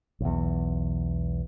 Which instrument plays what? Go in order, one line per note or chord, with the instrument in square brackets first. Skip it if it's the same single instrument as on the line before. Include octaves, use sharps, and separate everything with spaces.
[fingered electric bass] B1 E2